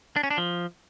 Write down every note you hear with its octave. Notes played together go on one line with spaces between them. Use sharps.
D4
C#4
D4
F3